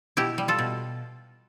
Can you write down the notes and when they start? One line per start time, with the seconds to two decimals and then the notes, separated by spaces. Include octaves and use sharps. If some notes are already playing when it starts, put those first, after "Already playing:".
0.17 B2 E4 G4
0.38 G3
0.48 F4 A4
0.58 B2